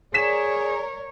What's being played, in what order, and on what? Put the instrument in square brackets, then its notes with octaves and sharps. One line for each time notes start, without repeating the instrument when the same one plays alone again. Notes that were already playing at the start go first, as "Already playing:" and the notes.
[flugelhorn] G#4 [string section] A#4 D5 [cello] C#5 [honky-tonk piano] B6 E7